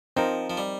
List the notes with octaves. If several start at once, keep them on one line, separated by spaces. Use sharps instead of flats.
F3 C4 D#4 A#4
F3
G3